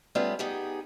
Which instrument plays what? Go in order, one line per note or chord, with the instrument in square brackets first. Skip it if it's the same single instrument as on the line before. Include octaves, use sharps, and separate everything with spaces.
[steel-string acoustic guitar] G3 A3 B3 C#4 F4 G#4
B3 D#4 G4 G#4